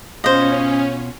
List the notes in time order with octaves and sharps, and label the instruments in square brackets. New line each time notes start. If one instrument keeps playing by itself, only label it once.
[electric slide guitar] B2 F4 [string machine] C#4 [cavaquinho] C5 D#5